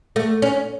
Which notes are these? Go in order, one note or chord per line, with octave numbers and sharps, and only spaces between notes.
A3
C#4